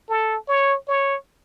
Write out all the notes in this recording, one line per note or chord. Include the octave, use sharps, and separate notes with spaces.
A4
C#5
C#5